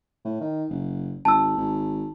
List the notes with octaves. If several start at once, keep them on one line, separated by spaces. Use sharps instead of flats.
A2
D#3
F#1
G#1 A5 E6
G#1